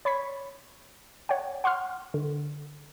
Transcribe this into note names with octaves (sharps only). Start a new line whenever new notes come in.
C#5 B5 C#6 G#6 B6
C#5 F#5 G5
F#5 C6 C#6 F6
D3